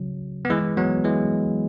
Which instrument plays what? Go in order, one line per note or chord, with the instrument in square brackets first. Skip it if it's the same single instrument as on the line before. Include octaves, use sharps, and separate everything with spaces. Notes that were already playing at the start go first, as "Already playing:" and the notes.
Already playing: [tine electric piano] C#3 F#3
B3
E3 G#3
F#3 B3
E3 G#3